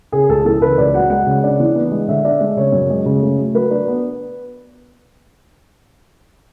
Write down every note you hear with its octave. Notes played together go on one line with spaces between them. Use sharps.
C#3 G#4
C#2 A4
E3 A4
C#3 B4
C#2 D5
F#3 F#5
G#3 F#5
C#3
D4
E3
B3
G#3
D3 E5
D4
G#3
C#3 C#5
F#2
G#3
C#3
A3
F#3
F#3 B4
D4
B3